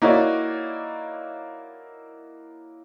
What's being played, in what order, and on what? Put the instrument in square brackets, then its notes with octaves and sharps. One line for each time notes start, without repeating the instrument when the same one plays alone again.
[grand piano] A#3 D#4 E4 F#4 C#5 D5